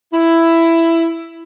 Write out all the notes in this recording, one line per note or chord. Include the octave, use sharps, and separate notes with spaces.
E4